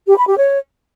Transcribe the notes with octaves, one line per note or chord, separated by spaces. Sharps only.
G4
B5
G4
C#5